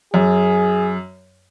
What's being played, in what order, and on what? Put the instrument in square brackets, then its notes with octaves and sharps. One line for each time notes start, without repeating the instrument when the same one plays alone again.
[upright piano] F#2 [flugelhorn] G#4